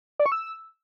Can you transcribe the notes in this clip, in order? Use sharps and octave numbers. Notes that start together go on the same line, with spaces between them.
D5
C#6
E6